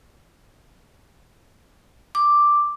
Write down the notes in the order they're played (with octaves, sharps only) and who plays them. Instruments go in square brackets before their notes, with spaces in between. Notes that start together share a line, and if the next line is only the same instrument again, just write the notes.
[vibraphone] D6